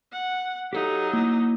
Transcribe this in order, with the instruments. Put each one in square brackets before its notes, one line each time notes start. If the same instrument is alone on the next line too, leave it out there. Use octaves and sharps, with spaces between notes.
[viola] F#5
[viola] F#3 D#4 [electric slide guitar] G4 A4 F5
[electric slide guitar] A#3 E4